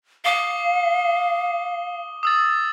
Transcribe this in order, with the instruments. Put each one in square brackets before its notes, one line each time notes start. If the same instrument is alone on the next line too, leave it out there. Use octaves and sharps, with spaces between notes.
[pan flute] F5 [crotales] D6 D#6 G7
[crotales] D#6 E6 A6